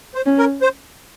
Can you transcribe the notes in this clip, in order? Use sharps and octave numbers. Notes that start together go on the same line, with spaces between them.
C5
C#4
A#4
C5